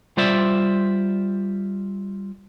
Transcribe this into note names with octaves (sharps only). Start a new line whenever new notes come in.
G3 F4 C5 D5 E5